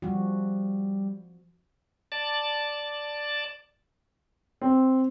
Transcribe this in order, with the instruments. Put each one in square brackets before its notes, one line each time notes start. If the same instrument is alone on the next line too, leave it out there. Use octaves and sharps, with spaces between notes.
[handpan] F3 F#4 [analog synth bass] G3
[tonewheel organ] D5 A5
[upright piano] C4